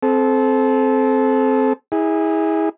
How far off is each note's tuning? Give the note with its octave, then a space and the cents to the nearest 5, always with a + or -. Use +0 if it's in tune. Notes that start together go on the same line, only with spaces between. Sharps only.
C4 +0 A4 -25
E4 -35 G#4 -20